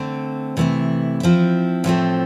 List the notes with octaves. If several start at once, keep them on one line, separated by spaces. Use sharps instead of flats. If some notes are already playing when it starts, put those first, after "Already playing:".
Already playing: D3 A3 C4
C3 E3 A3 E4
F3 C4 E4
A2 F3 A3 C4